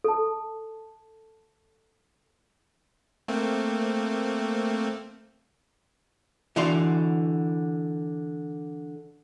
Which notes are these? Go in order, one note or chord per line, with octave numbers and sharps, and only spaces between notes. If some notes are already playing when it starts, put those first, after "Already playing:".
A4 A5
A3 A#3 C4
D3 E3 F#4 D5 F5 C6